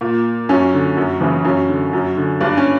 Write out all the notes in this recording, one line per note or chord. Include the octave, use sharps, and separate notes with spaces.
A#2
F#2 C#4
D3
F#2
C#3 E3
F#2 C#4
D3
F#2
D3
G2 D4
C#4